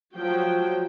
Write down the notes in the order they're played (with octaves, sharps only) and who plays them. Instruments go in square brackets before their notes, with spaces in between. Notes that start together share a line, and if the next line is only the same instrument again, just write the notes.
[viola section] F3 F#3 G5